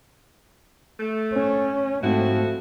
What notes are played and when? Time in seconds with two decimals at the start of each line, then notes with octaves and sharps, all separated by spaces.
1.00 A3
1.34 C#4
2.03 G#2 F3 A3 C4 E4 F#4